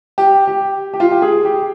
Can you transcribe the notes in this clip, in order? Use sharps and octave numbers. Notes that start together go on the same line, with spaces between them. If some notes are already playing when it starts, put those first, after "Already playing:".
G4
G4
G4
F4
G4
G#4
G4